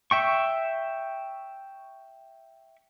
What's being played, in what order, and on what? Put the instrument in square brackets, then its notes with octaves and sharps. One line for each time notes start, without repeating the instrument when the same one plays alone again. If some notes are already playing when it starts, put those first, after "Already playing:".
[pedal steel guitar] E5 G5 C#6